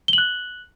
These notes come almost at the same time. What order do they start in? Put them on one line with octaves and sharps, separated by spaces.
G7 F#7 F#6